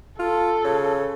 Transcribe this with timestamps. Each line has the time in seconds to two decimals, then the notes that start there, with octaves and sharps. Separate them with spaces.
0.19 F4 A4
0.64 C#3